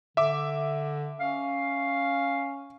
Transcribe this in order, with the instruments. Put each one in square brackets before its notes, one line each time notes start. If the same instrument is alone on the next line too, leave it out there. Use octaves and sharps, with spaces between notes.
[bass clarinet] D3 [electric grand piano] E5 D6
[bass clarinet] C#4 [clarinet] F5